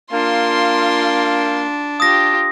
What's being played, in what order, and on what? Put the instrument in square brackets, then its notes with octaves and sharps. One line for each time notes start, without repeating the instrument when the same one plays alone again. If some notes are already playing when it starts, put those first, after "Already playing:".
[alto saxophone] A#3 [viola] D4 [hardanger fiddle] F4 C6
[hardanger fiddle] F4 G4 [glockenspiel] D#6 A#6